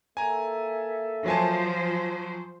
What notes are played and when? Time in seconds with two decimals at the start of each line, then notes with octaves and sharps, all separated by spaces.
0.17 A#3 A4 E5 G#5 A#5
1.26 F3 F#3 C5 G#5 A5